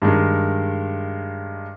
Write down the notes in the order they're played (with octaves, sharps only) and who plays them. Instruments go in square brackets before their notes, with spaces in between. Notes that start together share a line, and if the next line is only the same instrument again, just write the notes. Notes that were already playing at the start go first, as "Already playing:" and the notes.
[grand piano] G2 D#3 G#3